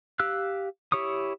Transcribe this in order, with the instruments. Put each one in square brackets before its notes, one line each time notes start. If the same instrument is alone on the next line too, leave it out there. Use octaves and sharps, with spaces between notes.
[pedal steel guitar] G4 F5 E6 F#6
E4 G4 C#5 C#6 D#6